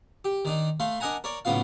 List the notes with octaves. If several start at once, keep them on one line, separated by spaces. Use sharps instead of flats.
G4
D#3 D4 D#4
A3 F5 C6
D4 A#4 D#5 F#5 G#5 A#5
A#4 C#5 D5
B1 A2 C#3 B3 F4 F5